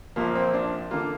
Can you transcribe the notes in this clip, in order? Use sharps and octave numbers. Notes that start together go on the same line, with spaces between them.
A#1 A#2 F3 A#3
C4
D4
D3 A#3 F4